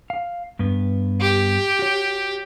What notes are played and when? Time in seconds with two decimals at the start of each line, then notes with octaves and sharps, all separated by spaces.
0.10 F5
0.59 G2 B3
1.21 G4
1.79 F#4 C#5